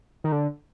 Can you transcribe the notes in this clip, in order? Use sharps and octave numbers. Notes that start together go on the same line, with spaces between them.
D#3
D3